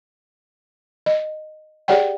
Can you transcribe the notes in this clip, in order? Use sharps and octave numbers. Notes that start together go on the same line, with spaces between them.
D#5
G4 G#4 C#5 D5 F#5 G5